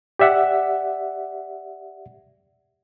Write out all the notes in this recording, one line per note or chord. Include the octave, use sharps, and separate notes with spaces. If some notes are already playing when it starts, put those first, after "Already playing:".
G4 D5 E5 F#5